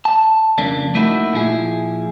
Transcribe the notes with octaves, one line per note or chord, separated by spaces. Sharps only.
A5
F2 C#3 A#3 D4
A3 A#3 D#4 E4 F#4
A#2 F3 E4 G#4